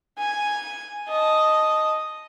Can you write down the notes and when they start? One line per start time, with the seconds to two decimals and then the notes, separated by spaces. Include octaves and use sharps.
0.18 G#5
1.09 D#5 A5